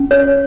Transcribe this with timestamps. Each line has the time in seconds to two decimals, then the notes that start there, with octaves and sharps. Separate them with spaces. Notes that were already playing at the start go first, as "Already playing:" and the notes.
Already playing: C#4
0.11 C#5